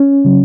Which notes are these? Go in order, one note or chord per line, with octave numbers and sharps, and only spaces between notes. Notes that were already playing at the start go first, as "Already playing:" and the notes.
Already playing: C#4
C#3 F#3